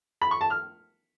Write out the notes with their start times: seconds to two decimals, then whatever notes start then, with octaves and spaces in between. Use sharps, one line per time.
0.22 B5
0.31 C#6
0.41 A5
0.50 F6